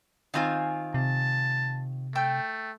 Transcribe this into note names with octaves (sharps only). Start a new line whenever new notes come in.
D#3 C4 F4 F5 G#5 G6
C3 A5
A3 G5 E6 G6